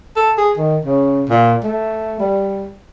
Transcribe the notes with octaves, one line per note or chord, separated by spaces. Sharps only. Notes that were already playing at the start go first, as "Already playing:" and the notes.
A4
G#4
D#3
C#3
A#2
A3
G3